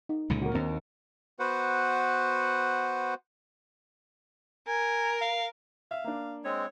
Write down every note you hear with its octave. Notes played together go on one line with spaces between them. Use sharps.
D#4
C#2 A#2 D3
F#4 A#4
D#2 C4 D4 A#5
B3 F#4 B4 C5 F#5
A#4 G#5
F5
E5 F5
A#3 D4
G#3 C4 C#5